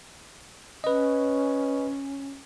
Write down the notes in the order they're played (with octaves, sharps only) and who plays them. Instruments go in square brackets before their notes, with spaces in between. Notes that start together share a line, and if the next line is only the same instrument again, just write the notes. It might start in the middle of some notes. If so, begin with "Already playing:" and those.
[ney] C#4 [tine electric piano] B4 D#5